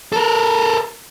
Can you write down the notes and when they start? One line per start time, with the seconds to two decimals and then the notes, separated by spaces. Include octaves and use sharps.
0.13 A4 A#4